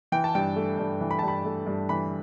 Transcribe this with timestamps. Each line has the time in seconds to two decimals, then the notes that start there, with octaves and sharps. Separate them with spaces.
0.12 E3 G5
0.24 A5
0.35 G2 G5
0.56 A3
0.79 G2
1.01 E3
1.11 B5
1.19 G2 A5
1.28 B5
1.45 A3
1.67 G2
1.89 E3 B5